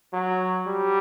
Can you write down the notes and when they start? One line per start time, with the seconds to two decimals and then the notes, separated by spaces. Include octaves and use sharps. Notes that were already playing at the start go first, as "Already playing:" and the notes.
0.13 F#3
0.67 G3